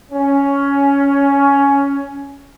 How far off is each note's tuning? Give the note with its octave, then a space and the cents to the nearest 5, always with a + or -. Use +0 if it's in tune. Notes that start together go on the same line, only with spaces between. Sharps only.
C#4 +10